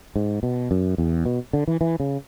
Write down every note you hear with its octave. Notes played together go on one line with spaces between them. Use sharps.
G#2
B2
F#2
E2
B2
D3
E3
E3
C#3